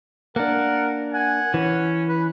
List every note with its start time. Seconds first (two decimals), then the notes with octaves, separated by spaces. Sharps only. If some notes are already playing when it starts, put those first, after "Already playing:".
0.36 A#3 D4 A#4 F#5
1.14 F#5 G#5
1.54 E3 C#4
2.09 B4